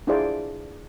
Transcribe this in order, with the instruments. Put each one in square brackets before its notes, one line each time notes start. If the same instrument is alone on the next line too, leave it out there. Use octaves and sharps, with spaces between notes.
[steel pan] D4 E4 F4 G#4 C5 D5